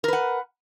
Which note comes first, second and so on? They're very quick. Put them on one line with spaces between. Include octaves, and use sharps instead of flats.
A#4 B4 F#5